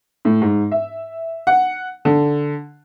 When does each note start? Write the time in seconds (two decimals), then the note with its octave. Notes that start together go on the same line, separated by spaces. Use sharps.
0.25 A2
0.42 G#2
0.71 E5
1.47 F#5
2.05 D3